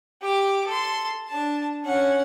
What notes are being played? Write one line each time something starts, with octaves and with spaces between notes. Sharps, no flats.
G4 D6
A4 C6
D4 A5
C#4 F#5